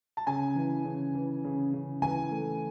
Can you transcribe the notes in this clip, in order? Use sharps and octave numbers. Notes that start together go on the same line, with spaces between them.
A5
C#3 G#5
E3
C#3
E3
C#3
C#3
E3 G#5
A3